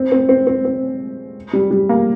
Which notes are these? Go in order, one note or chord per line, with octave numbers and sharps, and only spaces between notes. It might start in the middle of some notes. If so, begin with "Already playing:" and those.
Already playing: C4
C4
C4
C4
C4
G3
G3
A#3